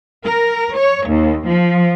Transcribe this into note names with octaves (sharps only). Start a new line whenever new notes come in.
A#4
C#5
D#2
F3